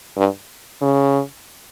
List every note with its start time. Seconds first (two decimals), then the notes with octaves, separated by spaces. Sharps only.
0.17 G2
0.82 C#3